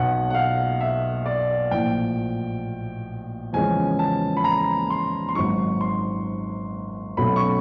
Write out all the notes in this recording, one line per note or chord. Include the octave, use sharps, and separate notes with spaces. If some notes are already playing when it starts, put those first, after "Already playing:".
Already playing: B1 B2 F#3 F#5
F#5
F5
E5
D5
A#1 A2 F3 G5
E2 C#3 F3 G#3 C#4 G#5
A5
B5
A#5
C6
C6
G#1 G#2 D#3 F#3 C#6
C6
B1 B2 F#3 A3 C#4 B5
C#6